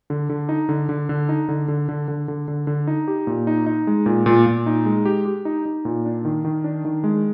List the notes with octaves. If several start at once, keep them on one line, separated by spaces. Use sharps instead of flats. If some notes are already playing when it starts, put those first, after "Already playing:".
D3
D3
D#4
D3
D3
D3
D#4
D3
D3
D3
D3
D3
D3
D3
D#4
G4
A#2
D#4
D#4
G#3
A#2
A#2
A#2
D#4
G#3
G4
G4
D#4
D#4
A#2
D4
D#3
D#3
D4
D#3
G#3